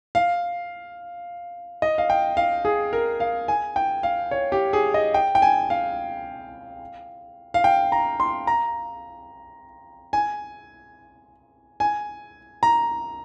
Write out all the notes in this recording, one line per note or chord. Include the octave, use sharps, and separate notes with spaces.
F5
D#5
F5
G5
F5
G#4
A#4
F5
G#5
G5
F5
C#5
G4
G#4
D#5
G5
G5
G#5
F5
F5
G5
A#5
C6
A#5
G#5
G#5
A#5